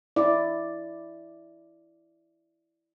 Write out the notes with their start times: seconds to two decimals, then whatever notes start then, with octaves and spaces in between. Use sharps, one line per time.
0.16 E4 D5